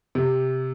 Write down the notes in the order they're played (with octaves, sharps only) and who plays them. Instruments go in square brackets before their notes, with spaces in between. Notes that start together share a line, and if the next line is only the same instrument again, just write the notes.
[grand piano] C3